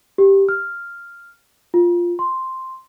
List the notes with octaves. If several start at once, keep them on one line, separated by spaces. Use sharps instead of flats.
G4
F6
F4
C6